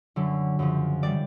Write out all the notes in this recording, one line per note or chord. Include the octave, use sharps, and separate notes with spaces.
F#2 D3 F#3
F#2 C#3 F3
D#3 G3 D5